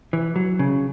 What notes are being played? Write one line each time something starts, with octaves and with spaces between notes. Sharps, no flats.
E3
F#3
C#3